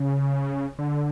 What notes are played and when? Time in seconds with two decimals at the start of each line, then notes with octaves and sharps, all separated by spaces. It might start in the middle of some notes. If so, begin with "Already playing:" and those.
Already playing: C#3
0.79 D3